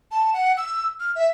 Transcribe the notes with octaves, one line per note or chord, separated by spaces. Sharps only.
A5
F#5
E6
F6
E5